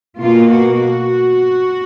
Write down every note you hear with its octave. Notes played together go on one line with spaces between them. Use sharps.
B2 A#3 F4
F#4
F#4